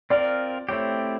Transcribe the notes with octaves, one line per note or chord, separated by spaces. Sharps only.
C4 F4 A#4 D5
A3 C4 E4 G4 C#5